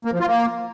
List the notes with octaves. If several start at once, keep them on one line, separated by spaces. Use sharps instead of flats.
A#3
F3
F4
A#3